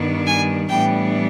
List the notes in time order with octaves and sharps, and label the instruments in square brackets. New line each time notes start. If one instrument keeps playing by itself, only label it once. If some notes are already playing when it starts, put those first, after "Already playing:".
Already playing: [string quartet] G2 D#3 G3 B3 D4
G#5
A2 E3 G3 B3 D4 G5